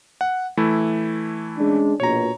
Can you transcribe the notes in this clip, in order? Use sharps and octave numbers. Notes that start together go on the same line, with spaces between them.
F#5
E3 A3 E4
G#3 C#4 D4
A#1 B2 C#5 A#5